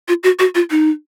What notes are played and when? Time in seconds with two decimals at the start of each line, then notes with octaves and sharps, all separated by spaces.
0.08 F4
0.23 F#4
0.39 F#4
0.55 F4
0.71 D#4